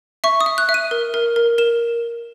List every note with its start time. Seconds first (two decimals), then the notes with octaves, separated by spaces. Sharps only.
0.24 E5 C#6
0.41 D#6
0.46 E5
0.58 F#6
0.69 E5
0.74 D#7
0.91 A#4
1.14 A#4
1.36 A#4
1.58 A#4 E7